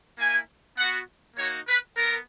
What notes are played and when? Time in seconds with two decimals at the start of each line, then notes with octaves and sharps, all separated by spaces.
0.18 A#3 E4 G#5
0.77 B3 F#4 F#5
1.37 A#3 D#4 F#4 C#5
1.68 B4
1.96 B3 A#4